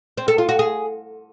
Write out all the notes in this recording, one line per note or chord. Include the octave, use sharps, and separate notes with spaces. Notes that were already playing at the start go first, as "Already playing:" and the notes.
C4
A4
F4
F#4
G#4